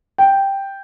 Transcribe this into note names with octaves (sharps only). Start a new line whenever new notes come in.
G5